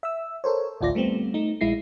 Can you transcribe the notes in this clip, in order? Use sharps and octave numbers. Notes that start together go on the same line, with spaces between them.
E5 E6
A4 A#4 C5 C#5
A1 D2 F4 D5 A#6
G3 A3 B3 C4
A3 D#4
A#1 G#3 E4 A#6 C7